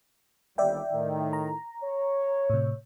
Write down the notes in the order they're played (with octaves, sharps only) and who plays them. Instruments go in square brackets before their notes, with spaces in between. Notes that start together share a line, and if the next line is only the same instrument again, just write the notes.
[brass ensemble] G1 D#2 G3 [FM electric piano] D5 E5 G5
[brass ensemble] A2 D#3
[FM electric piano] A#5
[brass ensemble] C#5
[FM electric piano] A2 C3